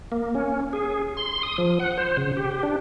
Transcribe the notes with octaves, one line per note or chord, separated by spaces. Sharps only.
A#3
C#4
G#4
C6
D#6
F3
F#5
C5
C#3
G4
D4